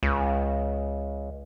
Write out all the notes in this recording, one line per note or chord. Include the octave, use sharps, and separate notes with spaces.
C#2